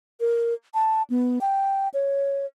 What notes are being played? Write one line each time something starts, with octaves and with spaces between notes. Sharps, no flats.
A#4
A5
B3
G5
C#5